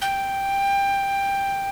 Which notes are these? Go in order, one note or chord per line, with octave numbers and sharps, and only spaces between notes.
G5